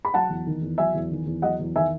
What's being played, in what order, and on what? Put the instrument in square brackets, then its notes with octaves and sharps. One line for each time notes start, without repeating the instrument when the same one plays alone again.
[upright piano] B5
F#3 F#5 A5
E2
D#3
E2
F#3 E5 G#5
E2
D#3
E2
F#3 D#5 F#5
E2
D#3 E5 G#5